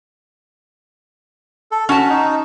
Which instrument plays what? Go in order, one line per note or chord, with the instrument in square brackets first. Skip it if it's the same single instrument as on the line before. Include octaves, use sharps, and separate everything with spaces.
[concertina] A4
[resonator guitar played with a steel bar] C#4 A5 [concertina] F#4
[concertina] D#4